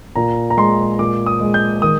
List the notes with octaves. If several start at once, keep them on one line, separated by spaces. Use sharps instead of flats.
A#2 A#5
A#5
G#3 C6
A#2 D6
D#6
G#3
G6
D#3 D#6